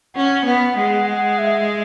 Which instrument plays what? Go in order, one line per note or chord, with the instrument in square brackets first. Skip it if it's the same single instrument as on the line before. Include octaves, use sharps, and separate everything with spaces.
[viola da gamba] C#4 [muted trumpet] F#5
[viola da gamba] B3 [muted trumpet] F#5
[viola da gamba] G#3 [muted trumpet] F#5
[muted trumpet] F#5
E5